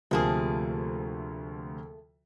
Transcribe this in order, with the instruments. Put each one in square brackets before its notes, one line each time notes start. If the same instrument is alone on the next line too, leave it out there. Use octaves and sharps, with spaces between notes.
[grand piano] D2 C3 F3 [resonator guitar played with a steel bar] A3 A#3 G#4